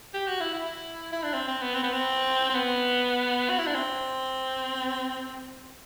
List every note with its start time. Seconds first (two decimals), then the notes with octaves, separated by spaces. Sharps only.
0.14 G4
0.28 F#4
0.41 E4
0.54 E4
1.12 E4
1.24 D4
1.34 C4
1.48 C4
1.62 B3
1.75 C4
1.83 B3
1.93 C4
2.50 C4
2.54 B3
3.50 F#4
3.58 E4
3.67 D4
3.75 C4